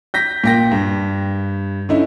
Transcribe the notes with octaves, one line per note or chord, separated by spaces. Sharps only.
G6 A#6 B6
A#2 G5 A#6
G2
D3 C#4 D#4 E4